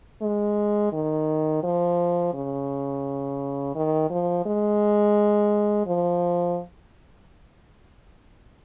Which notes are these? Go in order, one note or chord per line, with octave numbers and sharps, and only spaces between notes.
G#3
D#3
F3
C#3
D#3
F3
G#3
F3